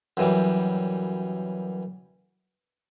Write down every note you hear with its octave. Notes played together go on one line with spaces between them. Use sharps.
F#2 E3 G3